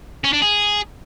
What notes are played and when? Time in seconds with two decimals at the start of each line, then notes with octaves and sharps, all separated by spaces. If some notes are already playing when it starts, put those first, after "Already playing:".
0.24 C#4
0.33 D4
0.42 G#4